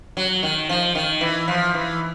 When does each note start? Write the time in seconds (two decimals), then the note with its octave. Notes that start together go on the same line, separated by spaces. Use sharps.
0.17 F#3
0.43 D#3
0.69 F3
0.95 D#3
1.21 E3
1.48 F3
1.74 E3